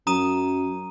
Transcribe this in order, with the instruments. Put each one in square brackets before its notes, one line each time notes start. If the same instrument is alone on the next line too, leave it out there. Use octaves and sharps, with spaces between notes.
[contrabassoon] F#2 [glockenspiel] A#5 D#6 D#7